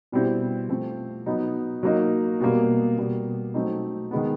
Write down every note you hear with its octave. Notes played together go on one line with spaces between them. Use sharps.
B2 G3 C4 E4
F3 A3 C4
F#3 B3 D#4
F#3 A#3 D#4
B2 G3 A#3
B2 G3 A#3
F#3 A3 C4 D#4
D#3 G#3 B3